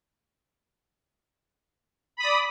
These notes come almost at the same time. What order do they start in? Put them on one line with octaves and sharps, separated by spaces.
B5 D#6 D5